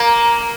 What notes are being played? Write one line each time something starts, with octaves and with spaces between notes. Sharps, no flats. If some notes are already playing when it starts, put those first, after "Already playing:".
Already playing: A#3 A#5